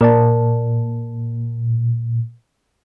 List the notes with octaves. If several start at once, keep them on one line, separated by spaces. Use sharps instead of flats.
A#2 A#4 D5 A5